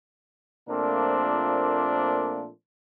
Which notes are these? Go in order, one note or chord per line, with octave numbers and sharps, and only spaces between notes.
A#2 F3 A3 A#3 C4 D4